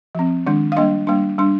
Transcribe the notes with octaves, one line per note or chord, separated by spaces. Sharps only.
F3 C4
D#3 G#3 D4
F5
G3 A#3 D4 D#5
G3 A#3 D4
G3 D4